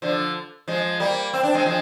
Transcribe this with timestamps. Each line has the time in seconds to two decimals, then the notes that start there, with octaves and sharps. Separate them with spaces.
0.02 D3 F3
0.68 F3 G#3
1.00 G3 A#3
1.33 C4
1.43 D4
1.54 G#3 C4
1.66 F3 G#3